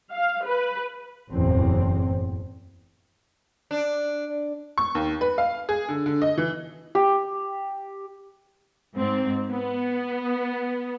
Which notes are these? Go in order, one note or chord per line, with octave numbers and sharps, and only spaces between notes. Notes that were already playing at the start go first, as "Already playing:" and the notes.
F5
B4
F#1 E2 A2 C4
D4
C#6
D#2
B4
F5
G#4
D3
D3
D#5
E3
G4
G#2 C4
B3